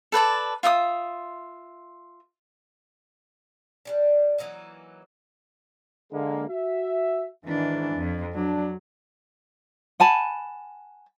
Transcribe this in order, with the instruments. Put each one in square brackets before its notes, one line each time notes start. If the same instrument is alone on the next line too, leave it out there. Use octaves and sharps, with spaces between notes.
[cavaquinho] A4 B4 D5 A5
F4 E5 F#5 D#6
[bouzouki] G3 G#3 D4
E3 F#3 A#3 D#4
[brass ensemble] D3 G#3 A#3
F#4 E5
[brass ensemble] G#2 E3 [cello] D#3 D4
[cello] F2
[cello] F#3 [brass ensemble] D4
[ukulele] F#5 G#5 A5 B5